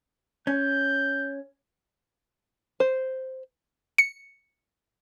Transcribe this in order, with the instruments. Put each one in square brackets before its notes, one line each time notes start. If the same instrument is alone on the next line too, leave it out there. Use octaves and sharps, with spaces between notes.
[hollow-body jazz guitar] C#4 [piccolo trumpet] G6
[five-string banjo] C5
[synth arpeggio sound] C#7